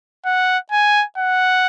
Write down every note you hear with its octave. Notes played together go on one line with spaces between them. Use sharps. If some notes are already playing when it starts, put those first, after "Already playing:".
F#5
G#5
F#5